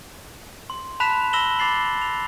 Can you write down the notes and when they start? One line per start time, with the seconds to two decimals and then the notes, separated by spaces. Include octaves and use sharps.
0.70 C6
1.00 A5 B5 F#6 B6 E7 F7
1.33 B5 E6 A#6 E7 F#7 G7
1.59 B5 D6 A6 C7 F#7
2.02 F7